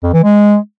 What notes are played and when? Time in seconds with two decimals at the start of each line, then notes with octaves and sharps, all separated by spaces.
0.03 F2
0.13 E3
0.24 G#3